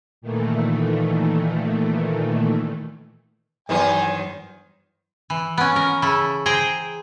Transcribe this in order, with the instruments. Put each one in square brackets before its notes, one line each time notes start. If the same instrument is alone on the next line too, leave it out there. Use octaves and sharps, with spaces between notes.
[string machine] A#2 D#3 E3 A3
[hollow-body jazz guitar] G2 E3 B3 [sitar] D#3 F#3 C5 [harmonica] G#5
[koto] E3
B3 C#4
A#4
C#3 E4 A4
G#4 C5 G5 A#5